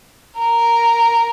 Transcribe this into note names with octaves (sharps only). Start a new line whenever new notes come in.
A#4